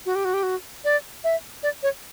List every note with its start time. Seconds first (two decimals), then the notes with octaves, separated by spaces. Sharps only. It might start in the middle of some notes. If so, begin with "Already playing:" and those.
0.06 F#4
0.15 G4
0.25 F#4
0.34 G4
0.43 F#4
0.85 D5
1.24 E5
1.63 D5
1.83 C#5